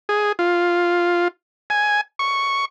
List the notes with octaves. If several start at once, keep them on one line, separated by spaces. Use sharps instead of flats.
G#4
F4
G#5
C#6